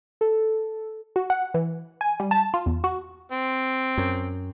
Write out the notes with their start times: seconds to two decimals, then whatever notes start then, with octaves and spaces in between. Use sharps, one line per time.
0.21 A4
1.16 F#4
1.30 F#5
1.54 E3
2.01 G#5
2.20 G3
2.31 A5
2.54 F4
2.66 E2
2.84 F#4
3.32 C4
3.98 F#2